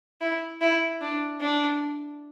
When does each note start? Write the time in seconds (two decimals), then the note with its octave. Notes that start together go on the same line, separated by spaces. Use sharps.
0.21 E4
0.61 E4
1.01 D4
1.40 D4